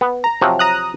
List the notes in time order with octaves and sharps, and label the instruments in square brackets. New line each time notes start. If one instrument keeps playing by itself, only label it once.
[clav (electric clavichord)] B3
[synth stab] A#5
[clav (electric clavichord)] C3 F3 F#3
[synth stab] A#5 D#6 F#6